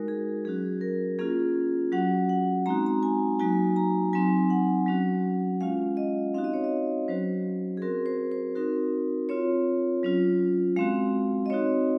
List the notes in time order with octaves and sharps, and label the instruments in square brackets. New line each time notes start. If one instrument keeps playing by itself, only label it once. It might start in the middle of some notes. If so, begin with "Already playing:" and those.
Already playing: [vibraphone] G#3 D#4 F#4 A#4
G#4
F#3 C#4 F#4 G#4
A#4
A#3 C#4 F4 G#4
F#3 C#4 F#4 F#5
F#5
G#3 C4 D#4 F#4 A#5
A#5
G#5
F#3 A#3 D#4 F#4 G#5
A#5
F#3 C4 D#4 G#5
F#5
F#3 C#4 F#4
G#3 C#4 F4 F5
D#5
C4 D#4 F#4 F5
D#5
C#5
D#5
F#3 C#4 F#4 C5
G#4
C4 F#4 A#4
C5
C5
C4 D#4 F#4 A#4
C4 F4 C#5
F#3 C#4 F4
G#3 C4 F#4 F5
D#5
C4 D#4 F#4 C#5